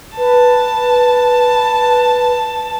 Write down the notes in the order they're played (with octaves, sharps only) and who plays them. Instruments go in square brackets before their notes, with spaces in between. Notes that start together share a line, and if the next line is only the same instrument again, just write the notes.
[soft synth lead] B4 [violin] A5